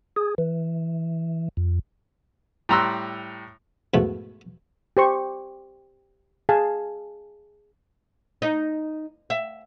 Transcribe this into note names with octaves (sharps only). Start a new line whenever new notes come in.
G#4
E3
F2
A2 G3 A#5 C6 E6 F#6
G#2 B2 F3 A3 E4 B5
G4 C5 C#6
G#4 F5 G#5 A5
D#4
E5